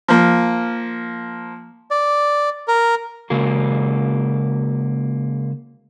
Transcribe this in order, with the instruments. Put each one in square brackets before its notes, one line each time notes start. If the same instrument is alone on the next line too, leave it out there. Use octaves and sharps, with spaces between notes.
[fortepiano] F3 A#3
[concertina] D5
A#4
[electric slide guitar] C#3 G#3 A#3 F#4